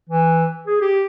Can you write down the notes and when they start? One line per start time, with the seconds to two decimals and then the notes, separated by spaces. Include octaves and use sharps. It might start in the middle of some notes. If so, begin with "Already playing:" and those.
0.09 E3
0.67 G#4
0.81 G4